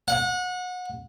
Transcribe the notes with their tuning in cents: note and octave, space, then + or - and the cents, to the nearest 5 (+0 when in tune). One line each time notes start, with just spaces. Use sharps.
F#5 -30